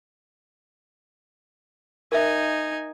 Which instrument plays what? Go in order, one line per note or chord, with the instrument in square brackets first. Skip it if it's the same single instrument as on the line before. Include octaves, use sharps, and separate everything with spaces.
[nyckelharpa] D#4 G#5 [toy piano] A#4 E5